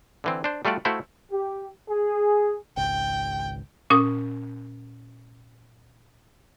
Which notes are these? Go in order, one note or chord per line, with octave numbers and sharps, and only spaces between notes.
D3 E3 C4
D4 C5
G3 A3 F4 F#4 D5
A3 E4 F#4 C5 F5
G4
G#4
G#1 C#2 G5
A#2 C#4 D#6